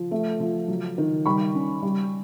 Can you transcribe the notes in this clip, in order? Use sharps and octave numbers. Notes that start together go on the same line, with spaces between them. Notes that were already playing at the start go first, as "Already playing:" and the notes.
Already playing: F3
A3
F3
F#3
D#3
G3 B5 C#6
C#4
G3